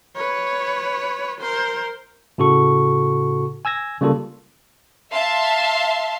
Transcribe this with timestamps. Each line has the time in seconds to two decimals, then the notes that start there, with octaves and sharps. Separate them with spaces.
0.16 B4 C#5
1.40 A#4 C5
2.38 A2 C#3 F#4 A4 C#6
3.65 G#5 E6 G#6 A#6
4.01 C#3 G3 A#3 F4 A4
5.12 E5 F5 A5 C6